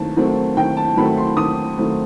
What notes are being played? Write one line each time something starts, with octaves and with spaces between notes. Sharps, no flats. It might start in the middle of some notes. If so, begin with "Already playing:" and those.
Already playing: D#2 F#3 A3 C4 A5
D#3 F#3 A3 C4
D#2 G5
A5
D#3 F#3 A3 C4 B5
C6
D#2 D#6
D#3 F#3 A3 C4